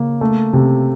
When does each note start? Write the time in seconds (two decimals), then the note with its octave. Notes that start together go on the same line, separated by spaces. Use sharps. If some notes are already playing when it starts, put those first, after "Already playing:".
Already playing: C#3 A#3
0.21 A3
0.53 C3